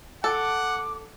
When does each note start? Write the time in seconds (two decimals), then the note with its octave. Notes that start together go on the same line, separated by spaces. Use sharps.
0.24 A4 F#5 D6